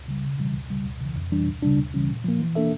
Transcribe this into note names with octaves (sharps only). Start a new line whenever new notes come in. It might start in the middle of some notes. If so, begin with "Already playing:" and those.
Already playing: C#2
C#3 G3
C#3
E3 G3
C#2
C#3 G3
C#2
C#3 E3
F2
E3 G3 D4
D2
C#3 G3 D4
D2
C#3 E3 G3 C#4
A#2
F3 A#3
E3
A#3 D4 A4 E5